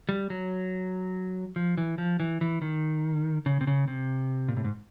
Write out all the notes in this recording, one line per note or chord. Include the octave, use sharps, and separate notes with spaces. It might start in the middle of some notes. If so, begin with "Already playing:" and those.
G3
F#3
F3
E3
F3
E3
E3
D#3
C#3
C3
C#3
C3
A#2
A2
G#2